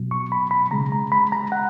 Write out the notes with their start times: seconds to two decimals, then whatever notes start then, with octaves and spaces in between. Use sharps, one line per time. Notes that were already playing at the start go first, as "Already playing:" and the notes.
Already playing: B2 F#3
0.11 C#6
0.32 B5
0.51 B5
0.71 C#3 G#3 A#5
0.92 A#5
1.12 B5
1.32 A#5
1.52 F#5